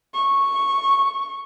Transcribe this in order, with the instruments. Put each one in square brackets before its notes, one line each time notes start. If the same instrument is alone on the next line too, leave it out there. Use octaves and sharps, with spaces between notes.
[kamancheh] C#6